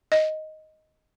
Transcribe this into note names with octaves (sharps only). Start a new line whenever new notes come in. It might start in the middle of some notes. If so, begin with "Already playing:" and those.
D#5